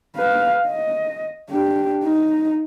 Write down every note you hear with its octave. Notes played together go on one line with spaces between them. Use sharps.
B4 F5
D#5
D4 G4
D#4